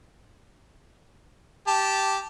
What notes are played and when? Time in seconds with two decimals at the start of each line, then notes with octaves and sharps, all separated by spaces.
1.67 G4 A5